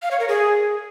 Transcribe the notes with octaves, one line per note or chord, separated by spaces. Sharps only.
F5
C#5
A#4
G#4